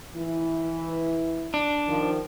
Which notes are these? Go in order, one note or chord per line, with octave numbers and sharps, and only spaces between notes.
E3 E4
D4
D#3 F3